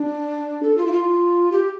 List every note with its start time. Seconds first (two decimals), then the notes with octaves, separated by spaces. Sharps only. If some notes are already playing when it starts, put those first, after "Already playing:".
Already playing: D4
0.63 A4
0.78 F4
0.87 E4
0.93 F4
1.52 G4